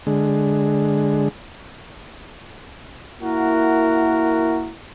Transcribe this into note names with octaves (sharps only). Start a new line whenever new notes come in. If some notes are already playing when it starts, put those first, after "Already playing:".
D3 G#3
A#3 E4 F#4 A#4 F#5